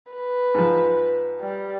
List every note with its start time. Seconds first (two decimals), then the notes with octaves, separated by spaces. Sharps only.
0.11 B4
0.54 G#2 F3
1.40 G3